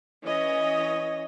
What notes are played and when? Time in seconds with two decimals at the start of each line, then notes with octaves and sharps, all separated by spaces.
0.23 E3 C#4 C#5 D#5